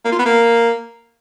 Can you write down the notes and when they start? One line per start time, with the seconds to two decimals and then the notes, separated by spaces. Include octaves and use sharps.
0.05 A#3
0.12 F4
0.19 B3
0.26 A#3